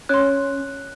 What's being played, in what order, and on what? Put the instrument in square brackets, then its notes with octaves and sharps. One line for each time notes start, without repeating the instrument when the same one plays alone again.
[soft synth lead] C#4 [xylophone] C#5 C6 [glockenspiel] F#6